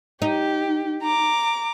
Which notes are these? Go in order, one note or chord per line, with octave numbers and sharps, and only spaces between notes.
D#4 G4
A#5 D6